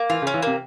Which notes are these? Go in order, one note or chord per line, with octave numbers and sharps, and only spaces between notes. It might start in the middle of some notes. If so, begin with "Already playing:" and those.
Already playing: A#3
E3 F4
C#3
C#4
E3
C3 A#3